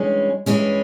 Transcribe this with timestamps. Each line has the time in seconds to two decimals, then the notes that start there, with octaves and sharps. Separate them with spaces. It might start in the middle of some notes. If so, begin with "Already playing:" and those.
Already playing: G2 E3 G#3 C#4
0.46 G2 E3 G#3 C#4